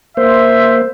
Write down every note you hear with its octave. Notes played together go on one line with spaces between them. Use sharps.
A#3 C5 E5